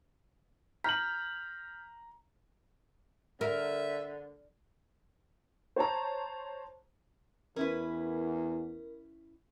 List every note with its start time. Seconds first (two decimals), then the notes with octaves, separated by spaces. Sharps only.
0.84 A#5 F6 G6 B6 F#7
3.41 D3 A#4 E5
5.76 C5 C#5 A5 A#5
7.56 E2 C#4 E4 A#4 B4